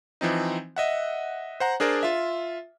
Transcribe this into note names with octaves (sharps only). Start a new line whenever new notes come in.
E3 F3 C4 D#4
D#5 E5 F#5
C5 F#5 A#5
D4 G#4 A#4 C5 D5
F4 E5